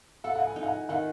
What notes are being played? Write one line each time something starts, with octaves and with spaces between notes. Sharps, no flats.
A4 F#5
F#5
G#5
D#4
F#5
G#5
D#3 F#5